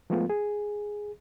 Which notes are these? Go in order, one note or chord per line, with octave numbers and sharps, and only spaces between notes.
F3 G#3 A3 B3 F4
G#4